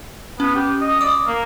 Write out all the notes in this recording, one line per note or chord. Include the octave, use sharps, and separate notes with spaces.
B3 C#4
G4
D#5
D5 D#6
A#3